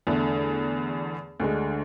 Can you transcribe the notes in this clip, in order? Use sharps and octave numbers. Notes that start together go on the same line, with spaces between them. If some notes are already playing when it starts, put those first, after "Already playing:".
E2 D3 A3
D2 D3 G#3